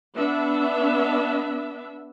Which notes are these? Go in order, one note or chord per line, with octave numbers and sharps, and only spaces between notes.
B3 D4 E5